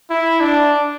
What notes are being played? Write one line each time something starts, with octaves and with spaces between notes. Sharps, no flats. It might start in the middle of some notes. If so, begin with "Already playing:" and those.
E4
D4